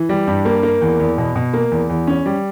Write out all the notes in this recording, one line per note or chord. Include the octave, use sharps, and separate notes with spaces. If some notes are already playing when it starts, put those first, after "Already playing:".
Already playing: E3
G3
G2
A#3
A#3
E2
E2
B2
B2
A#3
E2
E2
C#4
G3